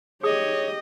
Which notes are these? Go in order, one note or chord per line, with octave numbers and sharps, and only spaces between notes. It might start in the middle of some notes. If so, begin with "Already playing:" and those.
G4 G#4 C#5 D#5 D#6